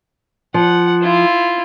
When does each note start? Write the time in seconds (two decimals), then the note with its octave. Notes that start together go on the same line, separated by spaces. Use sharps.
0.54 F3 F#5
1.02 E4 F4